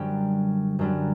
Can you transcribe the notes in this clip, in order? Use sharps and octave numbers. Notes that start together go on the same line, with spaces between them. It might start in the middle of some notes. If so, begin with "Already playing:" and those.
Already playing: F#2 D3 G3 G4
F#2 D3 G3